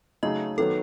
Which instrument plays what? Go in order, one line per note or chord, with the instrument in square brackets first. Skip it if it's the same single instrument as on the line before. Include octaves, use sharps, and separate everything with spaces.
[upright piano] C#3 F#3 A3 D#4 G#4 [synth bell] D#5
[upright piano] D#3 F#3 B3 [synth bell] A4